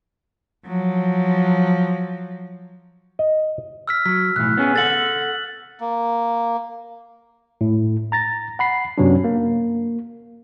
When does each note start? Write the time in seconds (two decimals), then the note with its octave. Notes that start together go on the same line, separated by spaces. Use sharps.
0.66 F3 F#3
3.19 D#5
3.88 E6 F6 B6
4.06 F#3 B6
4.36 B1 A2 E3 F#6
4.57 B3 C#4 G#4
4.76 A4 F#5 A6 F#7
5.80 A#3
7.61 A2
8.12 A#5 A6 A#6
8.59 F#5 B5 C7
8.98 F#2 C3 F#3 B3 C#4 D4
9.24 A#3